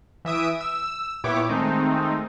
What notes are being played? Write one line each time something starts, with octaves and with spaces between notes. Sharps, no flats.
E3 E5 D#6 D7
E6
A#2 B3 E4 G4 C#5 D6
D#3 G#3 A3 C4 D#4